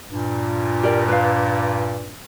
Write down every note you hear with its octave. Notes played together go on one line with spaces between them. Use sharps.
G2 A#2
G4 A#4 D5
B4 F5